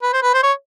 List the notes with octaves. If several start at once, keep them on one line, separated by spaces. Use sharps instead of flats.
B4
C5
B4
C5
C#5